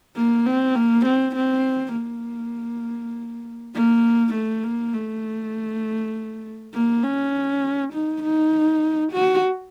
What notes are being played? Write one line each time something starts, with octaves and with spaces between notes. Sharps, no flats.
A#3
C4
A#3
C4
C4
A#3
A#3
A3
A#3
A3
A#3
C#4
D#4
D#4
F#4